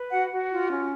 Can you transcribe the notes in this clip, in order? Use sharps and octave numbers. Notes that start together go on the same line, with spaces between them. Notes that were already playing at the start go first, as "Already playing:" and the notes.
Already playing: B4
F#4 F#5
F#4
F4
C#4